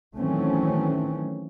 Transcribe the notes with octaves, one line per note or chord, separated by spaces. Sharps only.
D#3 E3 F#3 A3 C4 C#4